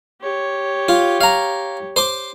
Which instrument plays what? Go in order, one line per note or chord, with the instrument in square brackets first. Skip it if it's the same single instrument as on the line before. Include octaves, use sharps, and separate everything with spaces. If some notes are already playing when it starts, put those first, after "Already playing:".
[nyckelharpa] G4 C#5
[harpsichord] F4
F5 A#5
C5 C6 D6